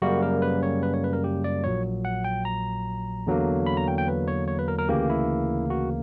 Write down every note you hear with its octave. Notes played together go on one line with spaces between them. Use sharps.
F#2 C#3 G3 A#3 F#4
A#4
B4
C#5
B4
C#5
B4
A#4
G4
D5
A#1 A#2 F#3 C#5
F#5
G5
A#5
E2 D3 F#3 A#3
B5
A#5
G5
G5
B4
C#5
C#5
B4
A#4
A#4
D2 C#3 E3 A#3 G4
E4
F#4